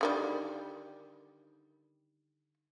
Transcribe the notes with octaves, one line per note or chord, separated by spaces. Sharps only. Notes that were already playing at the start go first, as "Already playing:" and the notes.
D3 D#3 G3